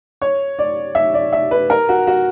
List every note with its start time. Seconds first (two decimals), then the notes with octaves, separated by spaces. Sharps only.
0.22 C#5
0.59 D5
0.95 E5
1.14 D5
1.33 E5
1.51 B4
1.70 A#4
1.89 F#4
2.07 F#4